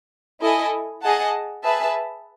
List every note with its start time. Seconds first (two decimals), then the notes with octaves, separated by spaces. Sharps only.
0.41 E4 A4 D#5 G#5
1.02 G#4 D#5 F#5 A5
1.64 G#4 B4 E5 A5